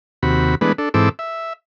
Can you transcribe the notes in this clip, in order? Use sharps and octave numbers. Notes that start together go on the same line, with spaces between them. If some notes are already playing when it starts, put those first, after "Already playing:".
D#2 C3 F#4 B5
E3 G#3 A3 B3 D4 B4
D4 A4
G#2 E3 C4 A4 D6 E6
E5